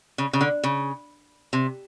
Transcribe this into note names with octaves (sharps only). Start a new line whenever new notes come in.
C#3
C#3
D3
C#3
C3